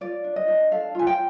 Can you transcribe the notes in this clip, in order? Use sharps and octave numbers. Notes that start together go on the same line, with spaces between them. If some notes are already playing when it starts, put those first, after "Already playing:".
F4 D5
D4
D#5
D4
A4 F5
F4 G#5
G5